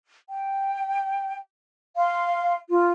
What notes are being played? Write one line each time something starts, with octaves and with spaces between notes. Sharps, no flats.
G5
F5 C6
F4